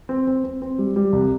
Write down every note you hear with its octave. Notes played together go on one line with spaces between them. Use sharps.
C4
C4
C4
C4
G3
G3
C2